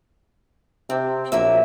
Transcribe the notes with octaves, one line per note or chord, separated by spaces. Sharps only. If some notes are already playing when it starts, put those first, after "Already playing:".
C3 C4
A#1 F#3 A#3 E5